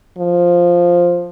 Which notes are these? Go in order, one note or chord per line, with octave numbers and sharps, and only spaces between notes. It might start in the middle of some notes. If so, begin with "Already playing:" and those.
F3